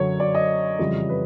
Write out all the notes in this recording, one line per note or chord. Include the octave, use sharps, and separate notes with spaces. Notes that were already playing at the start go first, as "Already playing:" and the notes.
Already playing: F#2 D3 F#3 C#5
D5
D#5
F2 C#3 E3 G3
B4